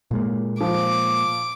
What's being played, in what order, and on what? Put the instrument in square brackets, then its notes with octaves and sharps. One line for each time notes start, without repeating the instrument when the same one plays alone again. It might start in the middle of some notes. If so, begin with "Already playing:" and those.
[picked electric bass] A#2 G#3 A#3
[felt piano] F3 [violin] D6